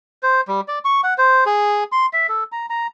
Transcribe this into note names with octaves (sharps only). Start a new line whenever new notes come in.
C5
G3
D5
C#6
F#5
C5
G#4
C6
E5
A4
A#5
A#5